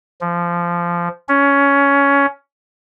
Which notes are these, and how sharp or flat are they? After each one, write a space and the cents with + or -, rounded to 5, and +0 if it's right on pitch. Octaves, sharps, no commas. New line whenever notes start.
F3 -15
C#4 +15